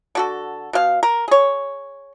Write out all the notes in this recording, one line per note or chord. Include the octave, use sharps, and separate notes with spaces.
D3 F#4 A4
B2 F5
A#4
G#4 C#5